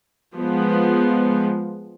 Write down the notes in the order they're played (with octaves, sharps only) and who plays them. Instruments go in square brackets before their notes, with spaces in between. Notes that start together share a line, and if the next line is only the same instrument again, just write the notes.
[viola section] F3 G#3 B3